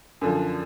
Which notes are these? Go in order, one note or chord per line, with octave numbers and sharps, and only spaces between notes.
F#2 D3 F3